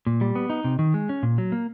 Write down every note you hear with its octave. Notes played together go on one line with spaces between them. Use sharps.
A#2
G3
B3
D#4
C3
D#3
G#3
C#4
A#2
F#3
A#3